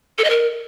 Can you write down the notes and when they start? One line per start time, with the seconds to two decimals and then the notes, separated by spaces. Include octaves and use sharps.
0.18 A4
0.24 D#5
0.30 A#4